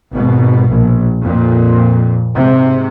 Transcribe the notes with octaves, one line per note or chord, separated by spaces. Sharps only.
G#1 B2
A#1
F2 A#2
G#2 C3